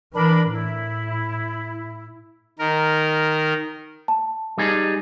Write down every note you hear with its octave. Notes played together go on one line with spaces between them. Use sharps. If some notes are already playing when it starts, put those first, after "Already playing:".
E3 D4 A#4 B5
A2 E4
D#3 A#4
A5
G3 D#4 G#4